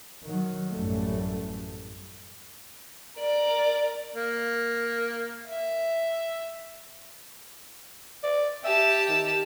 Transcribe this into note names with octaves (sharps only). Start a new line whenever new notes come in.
D#3 F#3
A1 F#2 A2 G3 A3
A#4 D5
A#3
E5
D5
G4 E5 A5
D#3